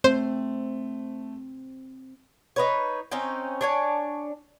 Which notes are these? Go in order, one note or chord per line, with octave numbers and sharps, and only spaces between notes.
A3 C4 C5
D#4 B4 C#5
C4 C#4 D#4 G5
D4 C#5 G#5